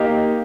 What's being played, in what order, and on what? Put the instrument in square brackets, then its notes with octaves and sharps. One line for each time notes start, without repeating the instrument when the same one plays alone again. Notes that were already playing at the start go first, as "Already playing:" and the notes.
Already playing: [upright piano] A#3 D#4 G4